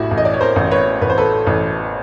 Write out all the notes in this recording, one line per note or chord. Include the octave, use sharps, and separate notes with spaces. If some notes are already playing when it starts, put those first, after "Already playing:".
Already playing: A1 A2 E4 F#4 G4
A1
D#5
D5
C#5
A#4 C5
A1
B4 C#5
A1 B4
C5
A4 B4
A1